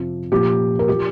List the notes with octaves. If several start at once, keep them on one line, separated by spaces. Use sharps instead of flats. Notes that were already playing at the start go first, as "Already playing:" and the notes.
Already playing: F2 C3 F3
A#2 F3 G4
A#4
F3 G4